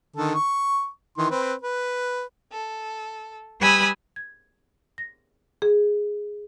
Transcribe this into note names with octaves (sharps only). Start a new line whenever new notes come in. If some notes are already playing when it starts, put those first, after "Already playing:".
D3 D#3 A4
C#6
D#3 E3 C6
C4 B4
B4
A4
G3 B4 G#5 B5 D#6 E6
G#6
A#6
G#4